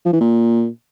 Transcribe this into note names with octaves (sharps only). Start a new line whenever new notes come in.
F3
E3
A#2